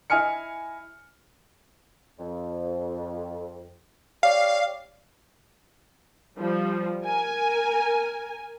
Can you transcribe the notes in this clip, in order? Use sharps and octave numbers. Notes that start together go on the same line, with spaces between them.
E4 D#5 G#5 F6 C#7
F2
G4 C#5 D5 F5
F3 G3
A#4 G#5